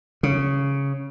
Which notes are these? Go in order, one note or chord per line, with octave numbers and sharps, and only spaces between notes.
C#3